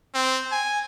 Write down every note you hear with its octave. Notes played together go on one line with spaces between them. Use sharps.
C4
G#5